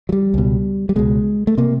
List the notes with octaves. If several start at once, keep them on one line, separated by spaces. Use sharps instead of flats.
F#3
G3
C#2 B2
G3
C#2 B2 G#3
A3
C3 A#3